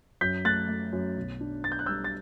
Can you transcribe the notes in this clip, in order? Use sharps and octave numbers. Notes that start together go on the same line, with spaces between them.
F#2 G6 B6
A3 F#6 A6
A3
F#2
B1
D4
D4 A6
G6
F#6
G3 E6 G6
A6